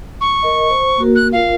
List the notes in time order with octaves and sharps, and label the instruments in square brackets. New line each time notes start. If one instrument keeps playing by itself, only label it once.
[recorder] C#6
[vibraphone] A#4 D#5
C5
A#3 F#4 A#4
[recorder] F#6
[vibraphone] F4 A#4 [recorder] F5